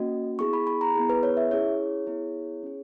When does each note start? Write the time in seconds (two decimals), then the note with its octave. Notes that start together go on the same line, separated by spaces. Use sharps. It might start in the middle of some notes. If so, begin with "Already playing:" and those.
Already playing: A#3 C#4 F#4 D#5
0.39 B3 E4 G#4 C#6
0.53 B5
0.67 B5
0.81 A#5
0.95 B3 E4 G#4
1.09 B4
1.23 C#5
1.37 E5
1.51 C#4 E4 G#4 C#5
2.07 B3 E4 G#4
2.63 C#4 G#4